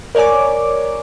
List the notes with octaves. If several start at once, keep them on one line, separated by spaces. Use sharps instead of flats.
A#4 C#5 D5 G#5 D6